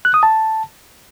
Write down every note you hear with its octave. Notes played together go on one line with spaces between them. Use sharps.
F#6
D#6
A5